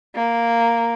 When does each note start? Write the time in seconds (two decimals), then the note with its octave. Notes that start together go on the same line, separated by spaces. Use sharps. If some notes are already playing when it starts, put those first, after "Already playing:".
0.15 A#3